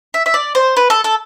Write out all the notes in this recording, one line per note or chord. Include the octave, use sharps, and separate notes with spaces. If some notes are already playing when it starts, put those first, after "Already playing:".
E5
E5
D5
C5
B4
A4
A4